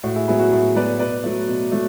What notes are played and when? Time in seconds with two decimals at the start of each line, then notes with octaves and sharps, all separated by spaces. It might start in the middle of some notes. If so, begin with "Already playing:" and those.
0.03 A2 F#4
0.16 E4 G#4
0.28 F#3 B3 E4 G#4
0.40 F#4
0.51 A2 E4 G#4
0.76 F#3 B3 B4 D5
0.99 B2 B4 D5
1.24 F#3 A3
1.48 B2
1.72 F#3 A3